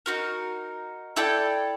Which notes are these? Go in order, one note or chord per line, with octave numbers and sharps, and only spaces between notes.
D#4 F#4 A#4
E4 A4 D5 G5